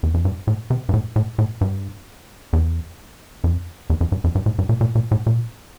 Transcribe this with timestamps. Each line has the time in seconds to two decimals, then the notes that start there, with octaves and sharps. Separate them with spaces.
0.03 E2
0.14 F2
0.25 G2
0.47 A2
0.70 C3
0.89 G2
0.93 A2
1.16 A2
1.38 A2
1.61 G2
2.53 E2
3.44 F2
3.90 E2
4.01 F2
4.12 G2
4.24 F2
4.35 G2
4.46 A2
4.58 G2
4.69 A#2
4.81 A#2
4.95 A#2
5.11 A2
5.26 A#2